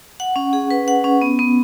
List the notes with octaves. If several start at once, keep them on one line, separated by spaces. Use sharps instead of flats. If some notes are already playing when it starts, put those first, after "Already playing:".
F#5
C#4
G#4
B4
F#5
C#4
B3
B3